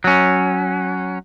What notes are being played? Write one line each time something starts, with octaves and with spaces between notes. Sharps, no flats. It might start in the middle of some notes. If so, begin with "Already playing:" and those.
F#3 C#4